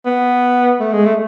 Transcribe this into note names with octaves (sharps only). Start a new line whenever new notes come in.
B3
A3
G#3
A3